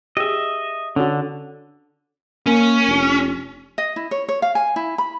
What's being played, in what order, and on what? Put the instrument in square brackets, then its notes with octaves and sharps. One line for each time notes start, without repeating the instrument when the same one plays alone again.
[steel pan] G4 G#4 [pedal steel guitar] D#5 E5
[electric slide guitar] D3 [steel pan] C#4 F#4
[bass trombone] A#3 [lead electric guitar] C#4
[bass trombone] F1
[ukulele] D#5
E4
C#5
C#5
F5
G#5
E4
B5